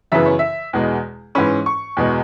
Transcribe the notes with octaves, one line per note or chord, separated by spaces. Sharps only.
F#2 C#3 E3 B3 E5
C#5
E5
E2 B2 G#3
G#2 E3 C#4 B4
C#6
E2 B2 G#3